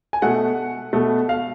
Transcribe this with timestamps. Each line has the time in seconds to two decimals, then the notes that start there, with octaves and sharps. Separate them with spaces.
0.13 G#5
0.22 B2 A3 F#5
0.93 B2 A3
1.29 F5